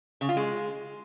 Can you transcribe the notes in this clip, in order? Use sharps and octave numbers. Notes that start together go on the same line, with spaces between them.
C#3
F4
G#3